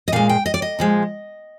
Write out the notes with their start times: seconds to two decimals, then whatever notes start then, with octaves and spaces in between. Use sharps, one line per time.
0.08 D#5
0.12 A#2 G#3 F5
0.29 G5
0.46 D#5
0.54 D5
0.62 D#5
0.79 A#2 F3 G#3